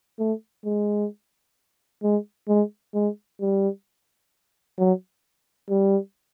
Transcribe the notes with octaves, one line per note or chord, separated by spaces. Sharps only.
A3
G#3
G#3
G#3
G#3
G3
F#3
G3